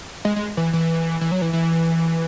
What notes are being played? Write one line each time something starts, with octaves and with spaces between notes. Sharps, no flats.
G#3
G#3
E3
E3
E3
F#3
E3
E3